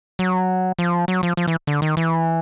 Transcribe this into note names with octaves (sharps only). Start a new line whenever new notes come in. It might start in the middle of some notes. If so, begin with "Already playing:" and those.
F#3
F3
F#3
F3
F3
E3
D3
D#3
E3